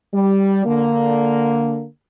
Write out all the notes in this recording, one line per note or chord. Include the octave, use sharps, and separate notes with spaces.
G3
D3 A#3